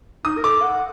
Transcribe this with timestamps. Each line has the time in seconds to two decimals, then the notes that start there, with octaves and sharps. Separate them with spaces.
0.25 D#4 D#6
0.38 A#4
0.44 A4 D6
0.62 F#5